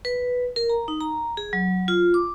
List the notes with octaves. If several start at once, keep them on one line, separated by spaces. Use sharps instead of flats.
B4
A#4
A#5
D#4
A#5
G#4
F#3
F4
D6